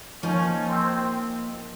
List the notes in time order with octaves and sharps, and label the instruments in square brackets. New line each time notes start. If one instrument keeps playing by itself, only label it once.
[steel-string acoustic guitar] F3 A#3 D#4 [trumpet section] C#4
[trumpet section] C4